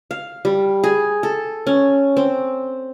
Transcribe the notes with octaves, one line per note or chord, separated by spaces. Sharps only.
F5
G3
G#4
A4
C#4
C4